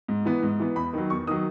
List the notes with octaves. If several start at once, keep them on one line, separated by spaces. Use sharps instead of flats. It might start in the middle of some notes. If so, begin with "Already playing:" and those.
G#2
E3 B3
G#2
E3 B3
E2 B5
D#3 F#3
E2 C#6
D#3 F#3 D#6